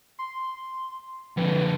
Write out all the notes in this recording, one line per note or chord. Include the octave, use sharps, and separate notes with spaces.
C6
F2 D3 B4